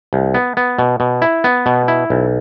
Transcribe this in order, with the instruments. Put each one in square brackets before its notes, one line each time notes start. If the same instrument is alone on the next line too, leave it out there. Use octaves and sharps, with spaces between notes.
[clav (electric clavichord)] C2
B3
B3
B2
B2
E4
B3
B2
E4
B1